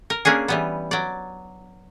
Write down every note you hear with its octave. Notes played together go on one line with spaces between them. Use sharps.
A#4
A#3 C#4 D4 G#4
E3 G3 B3
F#3 D5